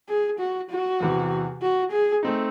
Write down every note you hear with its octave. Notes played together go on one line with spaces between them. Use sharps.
G#4
F#4
F#4
E2 C3 E3
F#4
G#4
A3 C4 D#4